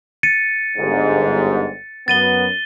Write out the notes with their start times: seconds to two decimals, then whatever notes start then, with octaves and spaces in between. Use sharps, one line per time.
0.23 A6 C#7 D#7
0.77 G1 G#2
2.08 F#2 B3 A6 D#7 G7